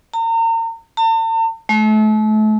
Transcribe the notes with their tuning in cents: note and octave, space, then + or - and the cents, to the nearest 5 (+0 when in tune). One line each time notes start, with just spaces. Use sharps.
A#5 -35
A5 +45
A3 -35